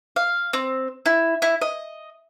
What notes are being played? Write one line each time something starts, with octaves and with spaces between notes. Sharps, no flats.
F5
C4
E4
E4
D#5